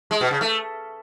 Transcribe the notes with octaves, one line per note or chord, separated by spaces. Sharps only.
G#3
B2
C#3
A3